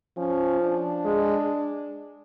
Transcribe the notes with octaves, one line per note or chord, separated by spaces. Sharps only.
F3 C#4
D4
G#3